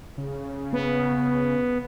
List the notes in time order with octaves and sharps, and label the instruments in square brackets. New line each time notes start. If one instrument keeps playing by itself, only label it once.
[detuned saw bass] C#3
[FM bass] B3